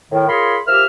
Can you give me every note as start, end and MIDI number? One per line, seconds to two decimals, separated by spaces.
0.12 0.25 45
0.12 0.25 51
0.28 0.58 65
0.28 0.58 68
0.28 0.58 70
0.28 0.58 73
0.28 0.58 83
0.28 0.58 84
0.67 0.85 53
0.67 0.85 67
0.67 0.85 70
0.67 0.85 76
0.67 0.85 89